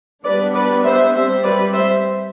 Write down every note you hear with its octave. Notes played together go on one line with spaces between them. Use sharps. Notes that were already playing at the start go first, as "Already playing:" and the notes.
G3 B3 D4 B4 D5
B4 D5
C5 E5
G3 C4 C5 E5
B4 D5
C5 E5